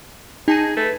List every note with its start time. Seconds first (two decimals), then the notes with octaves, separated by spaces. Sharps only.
0.48 D#4 G#4 A5 D#7
0.77 A3 B4